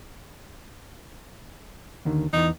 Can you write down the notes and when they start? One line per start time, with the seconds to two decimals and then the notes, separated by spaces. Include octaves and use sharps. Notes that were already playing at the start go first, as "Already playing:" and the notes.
2.05 D#2 D3 D#3
2.33 E2 E3 D#4